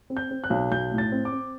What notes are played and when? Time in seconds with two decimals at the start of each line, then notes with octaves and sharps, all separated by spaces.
0.10 C4
0.17 G6
0.31 C4
0.44 F#6
0.50 B1
0.71 B1 G6
0.92 A2
0.98 A6
1.12 C4
1.25 D6
1.32 C4